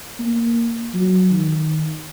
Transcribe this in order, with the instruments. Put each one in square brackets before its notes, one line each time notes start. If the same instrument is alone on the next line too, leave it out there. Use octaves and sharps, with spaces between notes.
[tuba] A#3
F#3
D#3